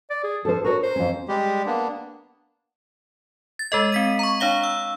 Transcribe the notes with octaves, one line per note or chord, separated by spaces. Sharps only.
D5
G#4
F3 A4 C5
F#4 A#4 B4 C#5
C5
F2 C#4
G3 G#3 G4
A#3 B3 D4
A6
G#3 A4 D#5
C4 B6 D#7
A#5 C#6
D4 C#5 F5 G7
E6